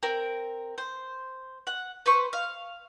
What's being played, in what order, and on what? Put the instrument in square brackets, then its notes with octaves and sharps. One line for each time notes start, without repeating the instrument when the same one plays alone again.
[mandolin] C4 A#4
C5
F#5
B4 C5 C#6
F5